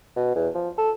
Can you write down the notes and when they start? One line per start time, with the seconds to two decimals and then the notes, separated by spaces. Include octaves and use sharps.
0.16 B2
0.35 E2
0.55 F3
0.78 A4